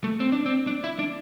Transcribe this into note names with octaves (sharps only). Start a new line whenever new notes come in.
A3
C4
D4
C4
D4
E4
D4